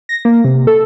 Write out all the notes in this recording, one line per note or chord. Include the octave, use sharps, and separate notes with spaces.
A#6
A#3
C3
A4